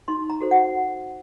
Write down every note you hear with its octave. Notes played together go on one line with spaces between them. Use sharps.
D#4 C6
A#5
F#4 A4 C5
F#5